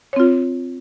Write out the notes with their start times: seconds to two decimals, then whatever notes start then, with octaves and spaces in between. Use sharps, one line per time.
0.13 C#5
0.16 C4
0.20 F4